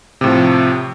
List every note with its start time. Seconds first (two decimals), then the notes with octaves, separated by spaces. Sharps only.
0.21 C3
0.24 A2
0.26 F3